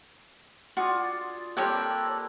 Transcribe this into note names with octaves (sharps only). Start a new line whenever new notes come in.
F4 F#4 G#4 D5
G3 A#3 C4 G4 A4 C#5 G5 F#6